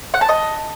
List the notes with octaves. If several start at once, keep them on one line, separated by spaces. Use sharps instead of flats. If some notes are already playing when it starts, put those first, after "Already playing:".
F#5
A5
D#5